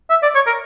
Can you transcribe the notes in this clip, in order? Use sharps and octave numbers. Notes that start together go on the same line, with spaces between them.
E5
D5
C#5
A#4